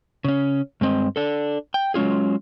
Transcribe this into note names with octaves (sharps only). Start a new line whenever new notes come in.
C#3 C#4
G2 G#3 C4 D#5
D4 A4
G5
F#3 G#3 C#4 F4 G#4